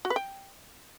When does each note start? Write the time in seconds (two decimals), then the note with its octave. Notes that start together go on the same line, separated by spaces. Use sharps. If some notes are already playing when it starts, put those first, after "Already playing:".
0.05 F#4
0.10 B4
0.16 G5